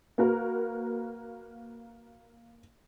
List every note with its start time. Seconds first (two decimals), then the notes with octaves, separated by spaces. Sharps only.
0.18 A#3 F#4 A#4 B4